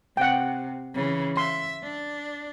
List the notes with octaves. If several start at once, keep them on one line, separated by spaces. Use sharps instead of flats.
C3 F#5 G5
C#3 E3
E5 C6
D4